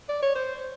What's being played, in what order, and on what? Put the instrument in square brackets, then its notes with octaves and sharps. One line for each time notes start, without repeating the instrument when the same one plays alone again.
[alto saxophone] D5
C#5
C5